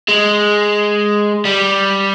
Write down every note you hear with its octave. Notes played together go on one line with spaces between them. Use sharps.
G#3
G3